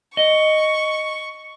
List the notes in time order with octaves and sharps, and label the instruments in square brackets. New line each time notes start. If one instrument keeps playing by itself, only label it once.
[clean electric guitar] D#5 [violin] C#6